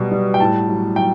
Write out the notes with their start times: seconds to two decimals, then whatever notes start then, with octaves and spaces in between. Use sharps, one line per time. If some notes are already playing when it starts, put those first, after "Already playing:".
Already playing: B2 F#3 G3
0.12 G3
0.34 G5
0.40 A2 A5
0.69 F#3
0.96 F#3 G5